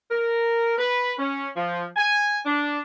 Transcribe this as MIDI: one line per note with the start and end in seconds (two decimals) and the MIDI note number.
0.10 0.73 70
0.78 1.13 71
1.18 1.48 61
1.56 1.85 53
1.96 2.38 80
2.46 2.79 62